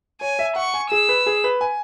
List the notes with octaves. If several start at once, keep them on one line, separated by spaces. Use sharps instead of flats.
C#5 G#5
E5
F#5 C#6
G#5
G#4 E6
B4
G#4
B4
G#5